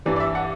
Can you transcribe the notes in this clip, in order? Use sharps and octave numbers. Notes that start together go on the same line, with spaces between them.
G2 E3 G3 D5
D5
E5
F#5